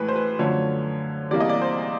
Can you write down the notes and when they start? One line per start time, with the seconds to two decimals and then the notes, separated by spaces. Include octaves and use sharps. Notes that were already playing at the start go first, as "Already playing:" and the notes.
Already playing: A2 E3 G#3 B4
0.08 C5
0.16 B4
0.39 F#2 D3 F3 A3 C#5
1.31 E2 C3 E3 G3 A#3 D5
1.40 D#5
1.49 D5
1.62 C5